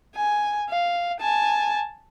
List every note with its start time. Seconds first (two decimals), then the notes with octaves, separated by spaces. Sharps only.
0.16 G#5
0.70 F5
1.20 G#5 A5